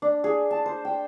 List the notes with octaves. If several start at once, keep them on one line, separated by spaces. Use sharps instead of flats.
D4
G#4
A5
C5
G5